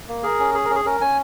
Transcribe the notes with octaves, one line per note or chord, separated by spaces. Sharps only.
A#3
G#4 A#4
C#4
G#4
A#4
C#4
G#4
C#4 A#4
C#4 G#5